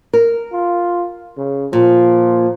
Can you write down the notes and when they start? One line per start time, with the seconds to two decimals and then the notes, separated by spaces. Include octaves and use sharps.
0.13 A#4
0.53 F4
1.38 C#3
1.73 A#2 F3